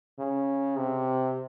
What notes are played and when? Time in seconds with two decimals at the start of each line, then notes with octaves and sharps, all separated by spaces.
0.19 C#3
0.77 C3